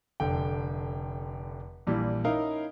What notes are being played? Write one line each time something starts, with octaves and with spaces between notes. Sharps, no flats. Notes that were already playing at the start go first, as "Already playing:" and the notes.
F1 D3 G5
A#1 A#2 E3 G3
C#4 D#4 E4 A#4 F5